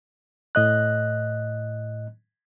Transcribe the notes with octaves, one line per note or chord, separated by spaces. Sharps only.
A2 D#5 F#6